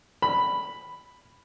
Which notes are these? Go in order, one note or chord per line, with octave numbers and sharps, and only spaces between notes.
B5